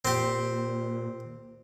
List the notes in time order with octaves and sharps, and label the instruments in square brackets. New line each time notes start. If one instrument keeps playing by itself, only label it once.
[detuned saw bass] A#2 [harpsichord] C4 G4